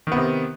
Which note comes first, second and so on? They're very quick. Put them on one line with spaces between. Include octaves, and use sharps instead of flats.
D#3 B3 C3